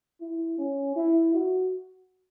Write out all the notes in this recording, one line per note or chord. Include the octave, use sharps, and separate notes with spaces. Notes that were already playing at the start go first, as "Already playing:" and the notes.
E4
C#4
E4
F#4